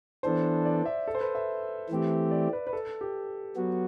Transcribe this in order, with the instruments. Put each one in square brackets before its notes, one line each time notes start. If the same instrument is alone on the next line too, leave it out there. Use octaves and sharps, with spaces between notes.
[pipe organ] E3 B3 D4 A4 [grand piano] C5
[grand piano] D5
E5
A4
C5
B4
E5
[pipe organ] E3 A3 C4 G4
[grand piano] D5
B4
B4
A4
G4
[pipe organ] F#3 B3 F#4